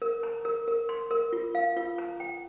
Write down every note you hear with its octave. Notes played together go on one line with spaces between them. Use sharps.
A#4
A#5
A#4
A#4
C6
A#4
F4
F5
F4
A#5
G5